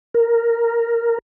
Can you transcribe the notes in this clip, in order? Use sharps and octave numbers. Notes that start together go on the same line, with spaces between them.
A#4